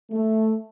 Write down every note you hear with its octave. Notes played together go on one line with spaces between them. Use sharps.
A3